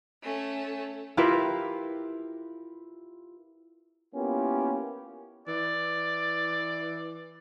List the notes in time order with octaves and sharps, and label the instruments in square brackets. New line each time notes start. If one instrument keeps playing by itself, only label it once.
[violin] A3 C#4
[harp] E4 F4 G4 A#4 B4 E5
[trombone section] A#3 B3 C#4 E4 F4 G4
[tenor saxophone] E3 [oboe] D5